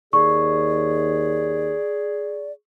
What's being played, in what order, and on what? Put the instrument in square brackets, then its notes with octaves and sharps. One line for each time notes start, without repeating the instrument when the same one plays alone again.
[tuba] D#2 [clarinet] G#4 [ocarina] D5 [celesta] C#6